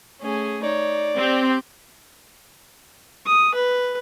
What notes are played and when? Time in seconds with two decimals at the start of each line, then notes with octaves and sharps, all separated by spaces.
0.21 A3 C#4 G#4
0.63 D#4 C#5 D5
1.16 C4 G4
3.26 D#6
3.55 B4